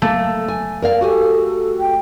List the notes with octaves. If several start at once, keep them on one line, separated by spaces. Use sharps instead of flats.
A3 A#3 A4
G#5
A#4 D5 F5
F#4 G4 A4 G#5
G5